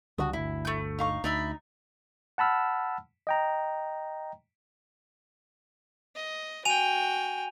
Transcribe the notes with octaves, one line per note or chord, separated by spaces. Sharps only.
C#2 D3 G3 F#4 C#6 D#6
G1 D2 E4
A3 G6
D#4 F5 C#6
D2 D#4 D5 E5 B5
F#5 A5 B5 E6 F6
D#5 G5 A#5
D#5
F#4 G5 G#5 D#7 F7